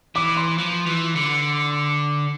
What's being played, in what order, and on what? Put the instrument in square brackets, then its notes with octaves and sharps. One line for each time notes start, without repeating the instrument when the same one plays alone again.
[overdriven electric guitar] E3 [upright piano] D6
[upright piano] C6
[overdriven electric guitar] F3
E3
D3